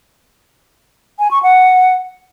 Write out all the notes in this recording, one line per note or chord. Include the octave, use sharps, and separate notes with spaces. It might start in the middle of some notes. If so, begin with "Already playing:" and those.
G#5
C#6
F#5